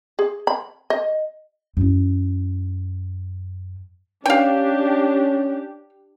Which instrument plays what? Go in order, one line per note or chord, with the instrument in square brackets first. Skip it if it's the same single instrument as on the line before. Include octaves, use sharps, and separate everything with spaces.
[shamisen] G#4
B5
D#5
[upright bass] F#2 E4
[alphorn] C#4 [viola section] D4 G4 [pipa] F5 G5